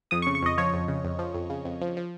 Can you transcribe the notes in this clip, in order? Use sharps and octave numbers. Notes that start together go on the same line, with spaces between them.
F2 D#6
C#6
C#3
C#6
F2 D#5
F3 C#5
F2
C#3
F2
F3
F2
C#3
F2
F3
F3